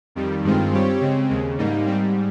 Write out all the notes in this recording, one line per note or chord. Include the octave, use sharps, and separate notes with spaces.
F2 D#3 G3
G2 D#3 G#3 C4 F4
G3 C4 G4 C#5
C#3 G#3 C4
D#2 C#3 G#3
G#2 G3 A#3 D#4
G#2 G3 C4